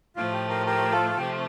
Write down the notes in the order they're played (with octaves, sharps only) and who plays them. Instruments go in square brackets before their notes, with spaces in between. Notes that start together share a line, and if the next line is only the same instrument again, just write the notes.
[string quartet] A2 F3 A3 [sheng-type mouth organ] F4
[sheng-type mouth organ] G4
G4 A#4
G4 A#4
F4 A4
A4
[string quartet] C3 F3 A3 [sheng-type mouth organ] G4